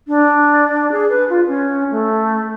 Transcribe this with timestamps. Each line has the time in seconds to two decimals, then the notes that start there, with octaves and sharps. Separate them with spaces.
0.08 D4
0.92 G#4
1.09 B4
1.30 F4
1.47 C#4
1.91 A3